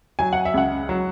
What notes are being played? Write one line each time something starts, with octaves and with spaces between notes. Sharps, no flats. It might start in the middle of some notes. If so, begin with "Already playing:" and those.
F#3 G#5
F#5
E5
C#2 F#5
F#3